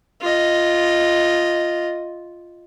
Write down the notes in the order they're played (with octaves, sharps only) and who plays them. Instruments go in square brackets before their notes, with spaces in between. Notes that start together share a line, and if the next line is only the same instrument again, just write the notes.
[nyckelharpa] F4 D#5